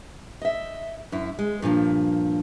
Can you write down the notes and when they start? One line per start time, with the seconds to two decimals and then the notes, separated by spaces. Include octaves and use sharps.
0.42 D#5 E5
1.12 F#2 E4
1.39 G#3
1.62 G2 A#2 E3 F3